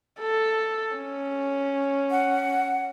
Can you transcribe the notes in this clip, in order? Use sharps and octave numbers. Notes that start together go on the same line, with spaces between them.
A4
C#4
F#5